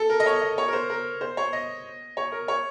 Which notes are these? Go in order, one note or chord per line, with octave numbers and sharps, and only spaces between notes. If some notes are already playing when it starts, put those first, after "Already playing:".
Already playing: A4
A#4
D#5
C#5
D#5
C#5
A#4
C5
A#4
C5
C#5
D#5
C#5
A#4
C#5